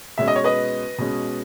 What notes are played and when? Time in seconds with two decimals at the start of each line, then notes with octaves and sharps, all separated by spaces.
0.18 B2 G#3 C#4 E5
0.28 D#5
0.36 C#5
0.44 B4 D#5
0.98 B2 G#3 C#4